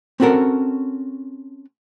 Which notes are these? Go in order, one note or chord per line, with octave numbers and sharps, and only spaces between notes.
C4 C#4 F#4 A4 A#4